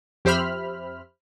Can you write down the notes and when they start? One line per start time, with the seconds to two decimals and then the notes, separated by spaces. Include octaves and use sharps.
0.25 F2 G4 C5 E5 B5 F6